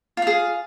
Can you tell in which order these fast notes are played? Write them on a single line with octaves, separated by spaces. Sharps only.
F4 F5 G#4